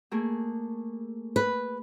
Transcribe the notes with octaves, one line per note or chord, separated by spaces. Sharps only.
A3 A#3 G#4
B4